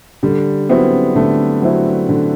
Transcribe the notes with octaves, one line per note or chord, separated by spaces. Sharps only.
D3 G3
F#3 B3 C4 E4
D3 A3
F#3 C4 E4
D3